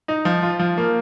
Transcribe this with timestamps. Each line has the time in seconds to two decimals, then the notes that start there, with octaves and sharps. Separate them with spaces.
0.08 D#4
0.25 F3
0.43 F4
0.59 F3
0.78 A#3